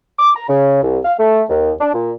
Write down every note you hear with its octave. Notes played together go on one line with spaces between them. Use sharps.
D6
A#5
C#3
C2
F5
A3
D#2
D4
A#2